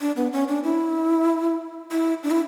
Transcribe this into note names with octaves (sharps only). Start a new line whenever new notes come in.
D4
B3
C#4
D4
E4
E4
D4
E4